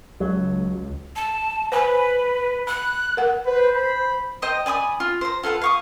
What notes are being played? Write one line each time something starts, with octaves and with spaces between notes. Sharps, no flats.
C#2 F#3
A5
B4 C5 G#5 B5
B5 F#6
A#4 F#5
B4 C5
B5
C5 D#5 G5 A#5
D5 G#5 B5 D#6
F4
C5 A#5
F4 A4 B4 F#5
F5 C#6 D#6